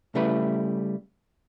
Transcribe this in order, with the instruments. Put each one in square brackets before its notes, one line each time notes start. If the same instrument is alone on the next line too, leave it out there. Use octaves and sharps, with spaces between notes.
[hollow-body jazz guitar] C#3 G3 A3 E4 B4